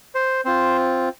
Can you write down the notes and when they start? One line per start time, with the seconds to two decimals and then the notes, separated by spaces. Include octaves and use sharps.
0.15 C5
0.45 C4 F4 C5